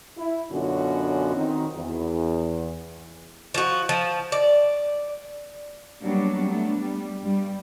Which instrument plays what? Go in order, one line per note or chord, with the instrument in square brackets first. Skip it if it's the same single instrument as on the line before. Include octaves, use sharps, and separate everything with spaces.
[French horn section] E4
F#2 B2 D3 C#4 F4 F#4
D#3 C4 D#4
E2
[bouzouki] F3 F#4
F3
D5
[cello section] F#3 G3 A#3 B3 D4
A3 B3 D4
G3
G2 G3